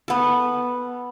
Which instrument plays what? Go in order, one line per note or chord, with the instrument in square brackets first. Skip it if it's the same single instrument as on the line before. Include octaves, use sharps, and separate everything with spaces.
[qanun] B3 A4